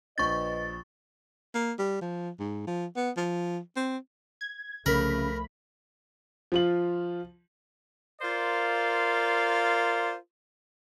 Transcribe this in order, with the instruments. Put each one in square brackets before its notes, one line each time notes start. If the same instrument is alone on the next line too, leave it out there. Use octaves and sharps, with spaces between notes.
[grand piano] A#1 D4 G6 [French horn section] B4 D#5 [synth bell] C#6 A6
[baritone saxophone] A#3
G3
F3
G#2
F3
B3
F3
C4
[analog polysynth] G#6
[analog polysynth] C2 B5 [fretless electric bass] C#3 [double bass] F3 A3 [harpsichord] A#4
[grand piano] F3 F4 F#7
[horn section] F4 A#4 C5 D5 F5